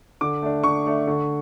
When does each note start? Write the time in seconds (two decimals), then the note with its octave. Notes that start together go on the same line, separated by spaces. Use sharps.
0.21 D3 D6
0.42 A3 D4
0.64 D3 C#6
0.86 A3 D4
1.07 D3